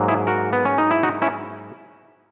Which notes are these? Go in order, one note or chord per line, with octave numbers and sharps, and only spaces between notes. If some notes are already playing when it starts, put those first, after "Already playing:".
Already playing: G#2 F#3 A#3
E4 G#4
F#4 A#4
B3
C#4
D#4
E4
D#4 F#4
C#4 E4